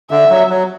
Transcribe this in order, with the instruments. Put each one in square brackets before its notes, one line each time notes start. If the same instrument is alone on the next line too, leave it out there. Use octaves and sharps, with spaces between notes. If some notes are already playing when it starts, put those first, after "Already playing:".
[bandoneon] D3 [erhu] E5
[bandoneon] F#3
F#3